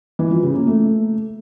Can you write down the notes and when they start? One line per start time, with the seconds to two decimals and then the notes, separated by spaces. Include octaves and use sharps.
0.19 E3
0.31 F3
0.43 C#3
0.55 A#3
0.67 A3